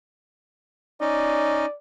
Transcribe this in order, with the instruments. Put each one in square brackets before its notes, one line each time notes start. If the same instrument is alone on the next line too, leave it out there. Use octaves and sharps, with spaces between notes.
[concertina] C#4 D#4 [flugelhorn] D5